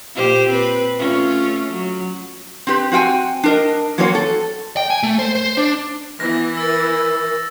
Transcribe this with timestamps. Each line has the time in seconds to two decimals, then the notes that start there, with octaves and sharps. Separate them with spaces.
0.15 A#2 G4 C5
0.49 C4 B4
0.97 A3 C#4 F4
1.72 F#3
2.67 C4 D4 G4 B4
2.92 C4 F#4 F5 G5 G#5
3.43 D4 A#4 D#5
3.98 F#3 A#3 C4 C#4 F#4 C#5
4.15 A4
4.77 G5
4.90 G#5
5.03 A3
5.19 C5
5.35 C5
5.57 D4
6.20 E3 B3 A#6
6.57 A#4 E6 A6